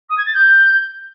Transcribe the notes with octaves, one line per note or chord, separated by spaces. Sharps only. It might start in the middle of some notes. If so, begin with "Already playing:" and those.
D#6
G#6
A6
G6